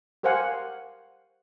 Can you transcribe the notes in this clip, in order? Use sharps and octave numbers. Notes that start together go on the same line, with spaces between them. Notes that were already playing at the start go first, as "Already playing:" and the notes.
G4 A#4 C5 F5 F#5 G#5